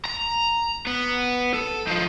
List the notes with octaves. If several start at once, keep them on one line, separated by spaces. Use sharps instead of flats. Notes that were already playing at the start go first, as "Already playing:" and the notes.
A#5
B3
A4
D#3 F3